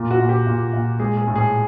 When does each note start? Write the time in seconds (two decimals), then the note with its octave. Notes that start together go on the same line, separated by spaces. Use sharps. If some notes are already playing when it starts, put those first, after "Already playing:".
Already playing: A#2
0.11 F#4
0.20 A#2
0.29 G4
0.47 A#2
0.74 A#2
0.99 G#3 G#4
1.17 G#4
1.27 A2
1.36 G#4